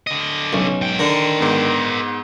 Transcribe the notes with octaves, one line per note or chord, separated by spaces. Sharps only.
D3 D#5
B1 C#4
G#2 G5
D3 D#3 A#4 C5
G#2 B3